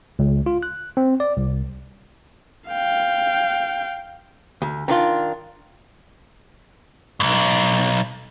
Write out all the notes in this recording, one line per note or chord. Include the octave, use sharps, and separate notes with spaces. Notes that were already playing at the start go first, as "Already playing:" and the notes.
C#2
F4
F#6
C4
D5
C2
F5 G5
D2
D#3 D4 F4
B1 G2